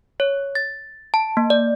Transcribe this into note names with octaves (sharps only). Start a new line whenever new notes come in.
C#5
A6
A5
A#3
D5